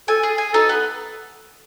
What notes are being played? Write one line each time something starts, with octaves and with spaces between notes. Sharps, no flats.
A4 G#5
G#4
G#5
D#4 A4
B3